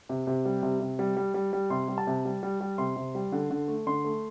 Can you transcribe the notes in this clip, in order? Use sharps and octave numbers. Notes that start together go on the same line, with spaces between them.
C3
C3
G3
C3
C3
G3
G3
G3
G3
C3 C6
G3
A5
C3
G3
G3
G3
C3 C6
C3
G3
D3
D3
A3
D3 C6
A3